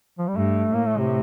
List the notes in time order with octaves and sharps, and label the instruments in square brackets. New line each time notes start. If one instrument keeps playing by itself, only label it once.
[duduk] F3
G3
[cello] G2 [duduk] A3
[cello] A2 [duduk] A#3
[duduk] A3
C3